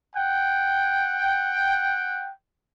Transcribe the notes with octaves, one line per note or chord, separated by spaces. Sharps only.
F#5 G5